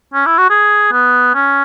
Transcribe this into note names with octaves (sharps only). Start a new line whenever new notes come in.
C#4
E4
F#4
G#4
B3
C#4